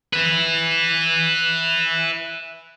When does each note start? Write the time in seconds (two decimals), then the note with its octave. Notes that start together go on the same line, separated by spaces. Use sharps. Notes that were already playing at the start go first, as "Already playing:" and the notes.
0.14 B4 E5